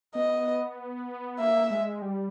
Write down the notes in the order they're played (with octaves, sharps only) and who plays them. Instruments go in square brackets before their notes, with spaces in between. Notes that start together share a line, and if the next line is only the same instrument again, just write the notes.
[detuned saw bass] B3 [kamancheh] D#5
[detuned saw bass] A#3 [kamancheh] E5
[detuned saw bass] G#3
G3